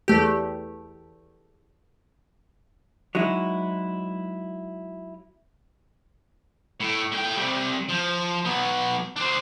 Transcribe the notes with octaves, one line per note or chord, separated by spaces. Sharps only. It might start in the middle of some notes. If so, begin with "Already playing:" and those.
E2 A3 G4
F#3 G#3 D#4 E4
A2
A2 G5
C3 G3
F3
F#3 B3
D4 C5